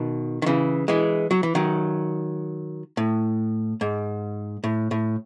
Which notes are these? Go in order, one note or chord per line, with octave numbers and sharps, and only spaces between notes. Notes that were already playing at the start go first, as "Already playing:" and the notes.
Already playing: B2 D#3
D#3
C#3 E3
E3 G#3
F#3
E3
D#3 F#3
A2
G#2
A2
A2